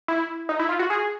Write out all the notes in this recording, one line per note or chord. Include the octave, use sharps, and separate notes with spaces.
E4
D#4
E4
F4
F#4
G#4